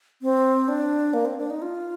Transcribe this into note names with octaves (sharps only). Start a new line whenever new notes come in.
C4
D4
A#3
C4
D4
D#4
F4